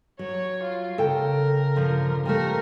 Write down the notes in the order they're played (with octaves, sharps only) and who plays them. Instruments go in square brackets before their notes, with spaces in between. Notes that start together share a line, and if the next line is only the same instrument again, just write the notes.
[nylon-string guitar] F#3 [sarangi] C#5
[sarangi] F4
[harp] C#3 [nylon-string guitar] A4 G5 [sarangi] A#4
[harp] G2 A#2 [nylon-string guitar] D3 F3
[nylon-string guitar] C3 F3 A3 [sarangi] A#4